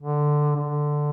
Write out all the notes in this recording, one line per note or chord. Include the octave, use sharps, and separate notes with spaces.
D3
D3